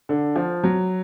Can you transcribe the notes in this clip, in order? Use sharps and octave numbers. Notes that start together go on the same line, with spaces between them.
D3
F3
F#3